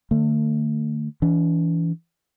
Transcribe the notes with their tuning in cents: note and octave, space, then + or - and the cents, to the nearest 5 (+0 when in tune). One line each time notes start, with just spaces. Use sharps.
D3 +40 A3 +35
E3 +0 D4 -45